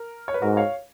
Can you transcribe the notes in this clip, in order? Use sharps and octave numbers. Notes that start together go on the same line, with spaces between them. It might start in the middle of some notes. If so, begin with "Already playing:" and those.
Already playing: A#4
C#5
B4
G#2 F#4 A#4
C#5 F5